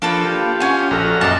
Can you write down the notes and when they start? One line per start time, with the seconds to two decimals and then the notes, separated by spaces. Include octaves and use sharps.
0.02 F3 A#3 D4 A4 B4
0.25 F4 G4
0.60 C#4 F#5 G#5 G#6
0.91 A#1 F#4 A4 A#5 F6
1.21 F#2 D#5 A5 D6